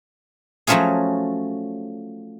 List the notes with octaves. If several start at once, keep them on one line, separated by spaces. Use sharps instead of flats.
F3 F#3 A3 C#4 F4 G#4